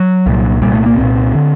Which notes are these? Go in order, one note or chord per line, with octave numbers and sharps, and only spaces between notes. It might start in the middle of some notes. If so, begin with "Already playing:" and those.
Already playing: F#3
C2 A#2
C2 A#2 G3
A3
A#3
C2 A#2 C4
D3